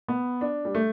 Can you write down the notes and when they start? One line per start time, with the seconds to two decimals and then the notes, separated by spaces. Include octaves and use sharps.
0.08 B3
0.41 D4
0.65 G3
0.75 A3